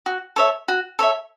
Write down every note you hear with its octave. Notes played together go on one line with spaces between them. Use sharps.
F#4
A4 C#5 E5
F#4
A4 C#5 E5